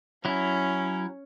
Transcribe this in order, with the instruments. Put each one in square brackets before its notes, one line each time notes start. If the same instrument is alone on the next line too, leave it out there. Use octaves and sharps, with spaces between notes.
[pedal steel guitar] F#3 E4 [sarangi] C#4